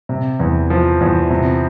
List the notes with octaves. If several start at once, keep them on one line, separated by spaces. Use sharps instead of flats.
C3
E2
F3
E2
C3